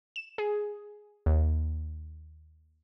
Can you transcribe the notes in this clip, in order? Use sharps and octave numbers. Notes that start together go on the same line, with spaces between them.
E7
G#4
D#2